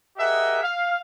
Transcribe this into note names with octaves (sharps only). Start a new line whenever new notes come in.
G4 G#4 A#4 D#5 E5 F#5
F5